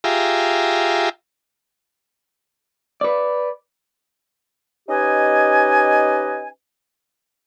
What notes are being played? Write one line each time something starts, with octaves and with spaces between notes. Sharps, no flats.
F4 G4 G#4 E5 A#5
B4 D5
C#4 D#4 G4 B4 D#5 G#5